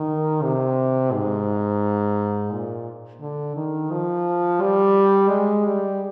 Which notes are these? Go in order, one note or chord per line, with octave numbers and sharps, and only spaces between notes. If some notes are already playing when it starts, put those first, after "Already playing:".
Already playing: D#3
C3
G#2
A#2
D3
D#3
F3
G3
G#3
G3